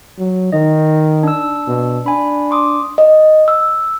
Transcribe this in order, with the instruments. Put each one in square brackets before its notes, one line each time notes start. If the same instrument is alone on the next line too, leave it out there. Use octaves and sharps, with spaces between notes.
[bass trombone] F#3
[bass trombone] D#3 [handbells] D#5
[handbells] D4 E6
[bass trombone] B2
[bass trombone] D4 [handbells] G#5 B5
[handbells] C6 D6 D#6
[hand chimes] D#5
E6